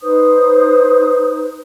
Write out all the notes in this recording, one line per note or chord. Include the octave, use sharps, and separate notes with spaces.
D#4 B4 C5 D#6